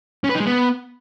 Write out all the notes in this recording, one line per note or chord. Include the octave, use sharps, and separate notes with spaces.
C#4
B4
D#4
G#3
B3